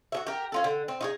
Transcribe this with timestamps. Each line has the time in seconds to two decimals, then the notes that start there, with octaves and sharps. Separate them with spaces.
0.12 F#4 G#4 E5
0.27 G4 A#4
0.52 C#4 F4 A4
0.64 D3
0.88 C4
1.01 D#4 F4 G#4